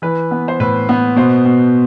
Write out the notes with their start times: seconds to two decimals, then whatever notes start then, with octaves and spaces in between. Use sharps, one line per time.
0.02 E3 B4
0.31 B3
0.48 C5
0.60 A2 B4
0.89 B3
1.16 B2 C5
1.45 B2